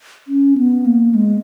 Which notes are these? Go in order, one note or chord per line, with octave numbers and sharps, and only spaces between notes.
C#4
B3
A#3
G#3